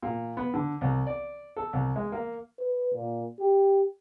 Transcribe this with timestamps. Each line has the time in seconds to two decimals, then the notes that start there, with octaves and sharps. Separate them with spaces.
0.03 A#2
0.37 B3
0.54 D3
0.81 C2
1.06 D5
1.56 A4
1.73 C2
1.96 G#3
2.12 A#3
2.59 B4
2.94 A#2
3.40 G4